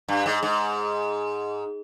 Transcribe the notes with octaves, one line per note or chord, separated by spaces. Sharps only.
G2
G#2
G#2